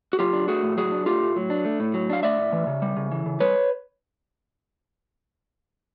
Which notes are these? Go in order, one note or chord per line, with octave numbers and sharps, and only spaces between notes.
F#4
F#3 F4 G4
D4
A3 F#4 G#4
A2
F#3 F#4 G#4
D4
A3 F4 G4
A2
F#3
D4
A3
A2
F#3
D4 F5
A3 D5 E5
A2
E3
C#3
G3
C#3
E3
C#3
G3 B4 C#5